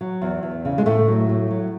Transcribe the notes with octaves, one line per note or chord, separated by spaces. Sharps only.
F#3
E2
E2
C#3
G#3
A2 A3
F#3
A2
F#3